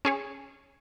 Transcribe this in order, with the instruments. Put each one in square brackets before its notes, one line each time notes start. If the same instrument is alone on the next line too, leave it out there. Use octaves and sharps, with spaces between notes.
[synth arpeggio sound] C#4 G#4 C#5